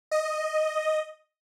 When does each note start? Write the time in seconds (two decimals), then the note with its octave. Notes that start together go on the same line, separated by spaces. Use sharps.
0.11 D#5